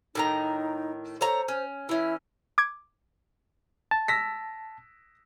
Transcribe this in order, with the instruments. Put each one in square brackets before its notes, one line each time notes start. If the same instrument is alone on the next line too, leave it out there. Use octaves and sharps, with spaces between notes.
[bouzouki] A2 D#3 A#5 [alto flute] D#4
[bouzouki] A3 C#5 A#5 [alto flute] C5
[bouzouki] C#4
[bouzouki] E3 C#4 [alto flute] E4
[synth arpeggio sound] D6 G#6
[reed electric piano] A5
[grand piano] E6 A#6 B6